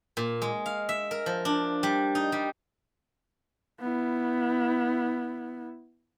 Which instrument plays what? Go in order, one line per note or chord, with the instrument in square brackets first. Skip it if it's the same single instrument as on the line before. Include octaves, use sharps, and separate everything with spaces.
[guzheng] A#2
G#3
F5
E5
A#4
F3
D4
G3
D#4
G3
[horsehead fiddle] B3 E4